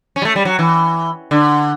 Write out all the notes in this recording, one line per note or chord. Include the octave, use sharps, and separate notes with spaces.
C#4
G3
A3
G3
F#3
E3
D3